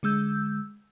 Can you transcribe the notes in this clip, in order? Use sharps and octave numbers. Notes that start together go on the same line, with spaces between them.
D3 G#3 E6 G6